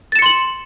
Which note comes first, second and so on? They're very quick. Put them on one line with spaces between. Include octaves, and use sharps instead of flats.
A6 E7 C#7 C6 F#7